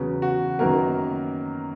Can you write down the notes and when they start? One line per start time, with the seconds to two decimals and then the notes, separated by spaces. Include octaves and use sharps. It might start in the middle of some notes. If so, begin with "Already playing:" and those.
Already playing: E2 C#3 F#3 B3
0.22 F#4
0.59 F#2 D#3 F#3 A#3 B3 A#4